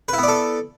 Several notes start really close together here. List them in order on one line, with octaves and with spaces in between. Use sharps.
B4 E4 B3 D5 A4